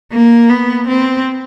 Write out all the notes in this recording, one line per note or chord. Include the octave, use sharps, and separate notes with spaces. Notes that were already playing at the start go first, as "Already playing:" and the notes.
A#3
B3
C4